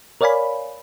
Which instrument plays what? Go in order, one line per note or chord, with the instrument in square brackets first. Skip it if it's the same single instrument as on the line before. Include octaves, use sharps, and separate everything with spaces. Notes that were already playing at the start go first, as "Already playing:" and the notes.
[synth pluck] A#4 C#5 D5 F5 G#5 B5